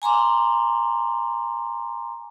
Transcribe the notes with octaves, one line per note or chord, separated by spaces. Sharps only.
G#5 A#5 C6 D6